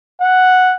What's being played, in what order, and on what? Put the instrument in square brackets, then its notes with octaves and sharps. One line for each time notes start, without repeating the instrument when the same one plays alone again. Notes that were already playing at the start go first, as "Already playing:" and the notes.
[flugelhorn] F#5